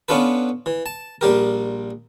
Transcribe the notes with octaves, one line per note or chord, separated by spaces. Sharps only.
B3 C#4 D4 F4 A4 B4
E3
A5
A#1 G3 G4 A#4